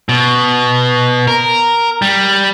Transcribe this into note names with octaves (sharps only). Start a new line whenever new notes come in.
B2
A#4
G3